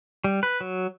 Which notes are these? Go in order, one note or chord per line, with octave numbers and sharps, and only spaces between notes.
G3
B4
F#3